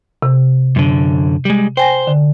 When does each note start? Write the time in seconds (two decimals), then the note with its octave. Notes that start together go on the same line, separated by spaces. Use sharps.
0.22 C3
0.76 F#2 D3
1.45 G3 G#3
1.77 C5 G5 G#5 A#6
2.07 D3